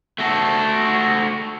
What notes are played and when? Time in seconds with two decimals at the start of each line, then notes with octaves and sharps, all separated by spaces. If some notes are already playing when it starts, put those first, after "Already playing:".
0.18 A3 F#4 A4